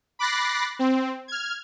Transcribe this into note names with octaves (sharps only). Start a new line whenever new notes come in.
B5 D6 F#6 A6 A#6 C7
C4
F6 G#6